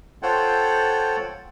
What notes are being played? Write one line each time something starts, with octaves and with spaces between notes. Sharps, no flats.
F4 A4 C5 C#5 F#5 G5